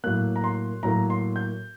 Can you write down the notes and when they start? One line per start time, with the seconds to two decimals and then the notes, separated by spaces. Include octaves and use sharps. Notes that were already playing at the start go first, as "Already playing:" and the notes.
0.04 A2 F#3 A#3 F#6
0.36 A#5
0.44 C6
0.83 A2 F#3 A#3 A#5
1.10 C6
1.36 G6